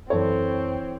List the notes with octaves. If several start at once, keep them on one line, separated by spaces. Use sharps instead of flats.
F#2 E3 C4 A4 C#5